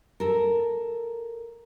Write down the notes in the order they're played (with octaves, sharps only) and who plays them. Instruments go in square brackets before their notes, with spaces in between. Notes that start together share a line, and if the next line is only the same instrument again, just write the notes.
[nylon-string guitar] A4 A#4